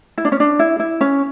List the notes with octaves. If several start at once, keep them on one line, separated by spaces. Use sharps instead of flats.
E4
D4
C#4
D4
E4
E4
C#4